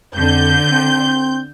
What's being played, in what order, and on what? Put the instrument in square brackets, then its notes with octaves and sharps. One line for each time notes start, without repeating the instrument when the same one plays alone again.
[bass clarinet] F2 [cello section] D3 [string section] G6
[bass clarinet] C4